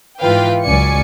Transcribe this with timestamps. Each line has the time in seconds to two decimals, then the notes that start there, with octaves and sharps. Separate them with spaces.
0.20 G#2 E3 F4 B4 F5 G5
0.64 C#2 F#3 C#4 D5 G#5 C#7